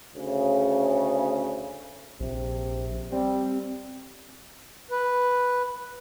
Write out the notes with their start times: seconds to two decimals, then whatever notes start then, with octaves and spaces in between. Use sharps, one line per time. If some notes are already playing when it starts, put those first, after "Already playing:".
0.16 D2 C#3
2.20 A#1 C3
3.12 G3 C4
4.91 B4